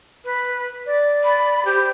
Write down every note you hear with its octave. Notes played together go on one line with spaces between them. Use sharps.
B4
D5
B5
G4 C5